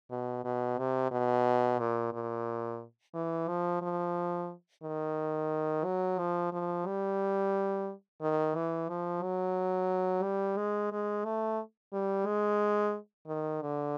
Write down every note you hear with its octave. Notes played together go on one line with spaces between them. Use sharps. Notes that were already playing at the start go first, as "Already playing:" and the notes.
B2
B2
C3
B2
A#2
A#2
E3
F3
F3
D#3
F#3
F3
F3
G3
D#3
E3
F3
F#3
G3
G#3
G#3
A3
G3
G#3
D#3
D3